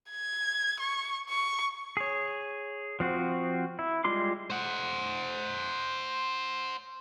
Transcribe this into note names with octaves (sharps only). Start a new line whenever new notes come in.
G#6
C#6
C#6
G#4 C#5
F3 C4 F#4
E4
G3 G#3 F4 C6 D6
C5 F#5